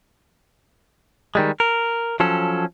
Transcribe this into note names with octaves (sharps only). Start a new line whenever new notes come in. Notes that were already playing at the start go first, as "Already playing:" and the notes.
D#3 G3 G#3
A#4
F3 F#3 C#4 A4